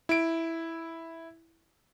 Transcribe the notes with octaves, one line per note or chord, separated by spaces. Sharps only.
E4 D7